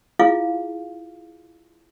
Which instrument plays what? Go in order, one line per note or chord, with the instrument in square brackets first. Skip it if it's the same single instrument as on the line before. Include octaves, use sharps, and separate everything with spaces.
[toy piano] E4 F4 G#4 F5